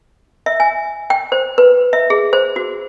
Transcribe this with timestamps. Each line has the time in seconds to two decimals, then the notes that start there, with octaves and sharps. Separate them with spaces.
0.46 E5
0.60 G#5
1.10 G5
1.32 C5
1.58 B4
1.93 E5
2.10 G#4
2.33 C5
2.56 F#4